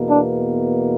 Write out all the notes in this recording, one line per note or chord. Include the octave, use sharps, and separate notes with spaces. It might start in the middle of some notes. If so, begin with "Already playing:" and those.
Already playing: E2 B2 A#3
D4